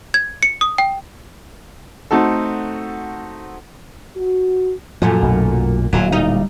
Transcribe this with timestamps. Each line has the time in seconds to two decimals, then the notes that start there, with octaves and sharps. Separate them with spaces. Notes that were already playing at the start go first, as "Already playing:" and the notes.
0.14 G#6
0.43 C#7
0.61 D#6
0.78 G5
2.11 A3 C4 D#4 F#4 A4
4.17 F#4
5.02 F#2 A#2 F3 A3
5.23 B1
5.93 D1 A#2 F#3 E4 F4
6.12 G3 D#4